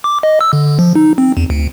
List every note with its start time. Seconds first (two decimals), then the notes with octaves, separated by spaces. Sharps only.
0.04 D6
0.23 D#5
0.41 E6
0.53 D3
0.79 F3
0.95 D#4
1.18 C4
1.37 E2
1.50 D2